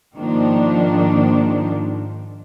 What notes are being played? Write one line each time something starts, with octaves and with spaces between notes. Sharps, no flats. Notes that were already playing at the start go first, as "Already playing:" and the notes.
G#2 D#3 F3 A#3 D4